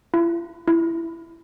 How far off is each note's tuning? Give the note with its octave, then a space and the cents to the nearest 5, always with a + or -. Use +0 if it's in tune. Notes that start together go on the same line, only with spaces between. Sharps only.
E4 +40
E4 +10